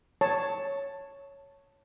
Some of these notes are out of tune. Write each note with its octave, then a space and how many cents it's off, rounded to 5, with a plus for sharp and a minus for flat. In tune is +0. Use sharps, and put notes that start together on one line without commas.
C#5 +0 A5 +10